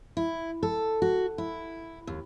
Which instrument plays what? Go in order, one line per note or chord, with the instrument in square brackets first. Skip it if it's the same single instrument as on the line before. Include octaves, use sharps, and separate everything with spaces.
[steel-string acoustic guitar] E4
A4
F#4
E4
D#2